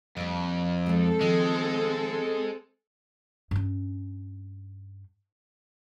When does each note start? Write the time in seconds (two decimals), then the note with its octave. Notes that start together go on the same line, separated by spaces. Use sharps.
0.17 F2 G3 A#3
0.86 F3 G#3 C4 A4
1.21 D#3 F3 G#3 F4
3.51 G2 C#4